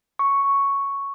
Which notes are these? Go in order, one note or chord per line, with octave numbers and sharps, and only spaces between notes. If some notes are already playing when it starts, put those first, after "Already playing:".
C#6